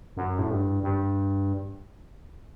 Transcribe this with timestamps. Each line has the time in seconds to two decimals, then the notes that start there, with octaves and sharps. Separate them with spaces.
0.17 F#2
0.39 A2
0.51 G2
0.83 G2